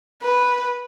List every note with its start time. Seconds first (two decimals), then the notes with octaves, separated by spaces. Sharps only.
0.22 B4